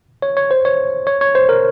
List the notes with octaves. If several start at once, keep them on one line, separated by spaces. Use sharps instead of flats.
C#5
C#5
C5
C#5
C#5
C#5
C5
A#4